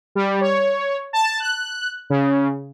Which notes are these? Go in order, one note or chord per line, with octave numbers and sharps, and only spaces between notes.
G3
C#5
A5
F#6
C#3